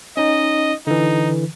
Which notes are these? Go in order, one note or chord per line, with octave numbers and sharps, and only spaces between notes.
C#4 D#4 D#5
D3 E3 D#4